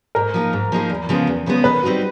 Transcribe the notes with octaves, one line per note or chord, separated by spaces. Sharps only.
G#2 A#4
F3 A#3 D#4 G#4
G#2
F3 A#3 D#4 G#4
E2
C#3 F3 G#3 B3
E2
C#3 F3 G#3 B3
D#3 B4
G3 C4 D#4 F#4